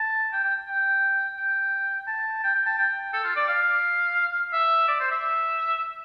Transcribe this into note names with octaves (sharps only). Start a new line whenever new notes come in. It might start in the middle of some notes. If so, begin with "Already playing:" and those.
Already playing: A5
G5
G5
G5
G5
A5
G5
G5
A5
G5
A4
F4
D5
F5
E5
D5
C5
E5